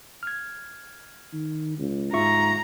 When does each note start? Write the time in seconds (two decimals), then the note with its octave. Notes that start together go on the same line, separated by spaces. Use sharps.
0.23 F6 G#6
1.33 D#3
1.78 C#2
2.13 G#2 F4 E5 A#5 C#6